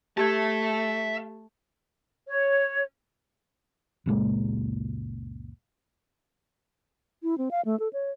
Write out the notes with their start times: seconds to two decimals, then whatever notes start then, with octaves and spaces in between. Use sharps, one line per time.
0.18 A3 G4 E5 A5 G#6
2.28 C#5
4.06 F#1 C#2 A#2 G#3
7.23 E4
7.38 C4
7.51 F5
7.65 A3
7.80 A4
7.93 C#5